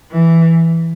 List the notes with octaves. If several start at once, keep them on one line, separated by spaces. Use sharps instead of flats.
E3